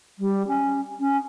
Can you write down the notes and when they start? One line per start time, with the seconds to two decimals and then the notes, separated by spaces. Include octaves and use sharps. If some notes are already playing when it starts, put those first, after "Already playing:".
0.19 G3
0.47 C#4
1.00 C#4